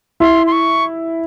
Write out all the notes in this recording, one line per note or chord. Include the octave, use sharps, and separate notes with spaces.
E4 C6
C6
C#6